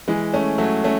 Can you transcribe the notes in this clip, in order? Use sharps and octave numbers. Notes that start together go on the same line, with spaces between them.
E3 G#3
A3 C#4
F#3 A3
A3 C#4